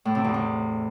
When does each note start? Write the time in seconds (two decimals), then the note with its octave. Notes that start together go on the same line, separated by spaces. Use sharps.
0.05 A2
0.15 C3
0.24 E2
0.34 C3